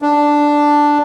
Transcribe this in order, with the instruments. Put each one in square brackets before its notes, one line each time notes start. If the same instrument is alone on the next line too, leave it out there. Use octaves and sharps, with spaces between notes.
[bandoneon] D4